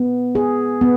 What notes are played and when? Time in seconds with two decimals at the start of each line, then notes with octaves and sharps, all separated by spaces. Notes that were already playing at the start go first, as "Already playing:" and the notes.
Already playing: B3
0.35 G#4
0.81 B3